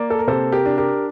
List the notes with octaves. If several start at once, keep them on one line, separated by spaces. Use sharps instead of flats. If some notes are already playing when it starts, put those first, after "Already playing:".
Already playing: A#3 D5
A4
A#4
C3 A4 C5
G4 A#4
D4
G4 A#4